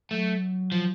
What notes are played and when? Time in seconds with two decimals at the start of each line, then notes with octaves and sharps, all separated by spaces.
0.11 F#3 A3
0.72 F3